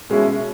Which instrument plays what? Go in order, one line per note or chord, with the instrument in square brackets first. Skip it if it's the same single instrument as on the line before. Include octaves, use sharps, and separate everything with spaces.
[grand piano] B2 G#3 C#4 E4